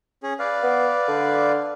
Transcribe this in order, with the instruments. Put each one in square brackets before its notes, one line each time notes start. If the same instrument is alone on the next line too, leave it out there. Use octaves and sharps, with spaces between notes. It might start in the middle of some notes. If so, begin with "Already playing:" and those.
[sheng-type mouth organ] C#4 G#4
B4 D5 F5
[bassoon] B3
D3